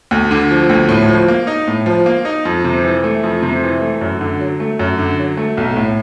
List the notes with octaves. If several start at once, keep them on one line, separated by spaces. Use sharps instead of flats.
D2
D3
F3
D2
A2
F3
A#3
D#4
A2
F3
A#3
D#4
F2
C3
E3
A3
F2
C3
E3
A3
F#2
D3
F#3
A3
F#2
D3
F#3
A3
B1
A2